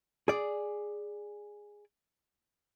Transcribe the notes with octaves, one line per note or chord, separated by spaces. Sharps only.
G#4 D5